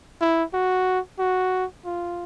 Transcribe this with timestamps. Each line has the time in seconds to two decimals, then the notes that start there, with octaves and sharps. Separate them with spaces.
0.21 E4
0.53 F#4
1.19 F#4
1.85 F4